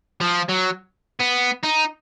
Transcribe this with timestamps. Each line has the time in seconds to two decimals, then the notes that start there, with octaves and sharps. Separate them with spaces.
0.21 F3
0.49 F#3
1.21 B3
1.64 D#4